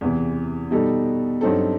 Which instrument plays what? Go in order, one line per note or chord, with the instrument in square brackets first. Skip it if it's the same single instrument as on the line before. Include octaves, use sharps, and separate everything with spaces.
[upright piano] E2 C3 E3
B2 G3 D#4 A4
G2 F#3 C4 D#4 A4